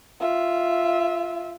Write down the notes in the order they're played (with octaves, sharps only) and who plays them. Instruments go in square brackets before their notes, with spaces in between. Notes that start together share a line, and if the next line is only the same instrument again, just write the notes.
[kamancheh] F4 E5